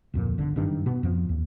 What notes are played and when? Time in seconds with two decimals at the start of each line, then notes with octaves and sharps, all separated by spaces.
0.14 D1 F2 A#2
0.38 G1 D3
0.56 F#1 G2 D#3 D4
0.86 B2 B3
1.03 F2 F3
1.29 D#2